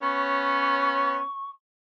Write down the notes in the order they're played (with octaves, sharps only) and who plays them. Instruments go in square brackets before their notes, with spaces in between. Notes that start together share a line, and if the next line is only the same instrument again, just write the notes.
[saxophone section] B3 C#4 [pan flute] C#6